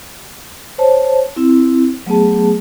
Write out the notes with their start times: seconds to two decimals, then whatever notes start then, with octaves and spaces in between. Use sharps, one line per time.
0.78 C5 C#5 A5
1.36 C4 E4
2.06 F#3 A3 B3 G#4 A5